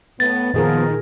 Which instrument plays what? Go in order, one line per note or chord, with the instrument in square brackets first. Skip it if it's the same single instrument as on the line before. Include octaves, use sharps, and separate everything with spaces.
[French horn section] A2 B3 [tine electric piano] A6
[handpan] A#2 G#4 A#4 [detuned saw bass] D#3 [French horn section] F3 B3